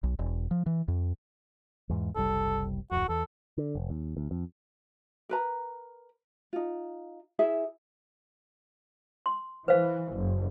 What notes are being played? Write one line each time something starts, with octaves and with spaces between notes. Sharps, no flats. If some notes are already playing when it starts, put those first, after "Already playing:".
B1
E1
F3
E3
F2
E2 G#2
F#1 C2 G3 A4
D1 F2 F#4
E2 A4
D3
F1
D#2
D2
F2
A#4 B4 A#5
D#4 F4
E4 G#4 E5
C6
E3 B4 C5 F5
F#1